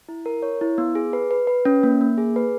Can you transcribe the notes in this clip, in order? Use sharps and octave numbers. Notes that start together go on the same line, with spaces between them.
E4
A#4
C#5
E4
B3
G#4
B4
B4
B4
C#4
A#3
A#3
G#4
B4